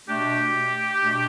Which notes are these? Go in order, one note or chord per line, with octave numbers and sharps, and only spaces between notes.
B2 A3 D4 G4
B2 A3 D4